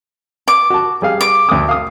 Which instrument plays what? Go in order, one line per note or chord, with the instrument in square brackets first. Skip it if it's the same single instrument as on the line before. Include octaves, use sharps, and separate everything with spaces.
[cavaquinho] D6
[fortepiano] F#4 A5
G3 G#4 F5
[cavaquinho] D6
[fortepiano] D2 D#6
F5 D#6